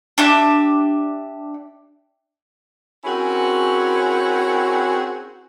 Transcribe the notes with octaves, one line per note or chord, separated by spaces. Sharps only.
D4 G4 E5
C4 C#4 E4 F#4 G#4 A#4